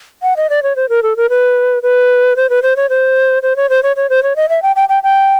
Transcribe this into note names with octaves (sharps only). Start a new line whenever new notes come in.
F#5
D#5
D5
C#5
C5
A#4
A4
A#4
B4
B4
C5
B4
C5
C#5
C5
C5
C#5
C5
C#5
C#5
C5
C#5
D#5
E5
G5
G5
G5
G5